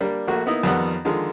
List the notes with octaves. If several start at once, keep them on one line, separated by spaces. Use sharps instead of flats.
G3 A#3 D4
A#1 A3 A#3 F#4
A#3 B3 D#4 E4
F2 D#3 G3 B3 F#5
D3 D#3 F3 G#3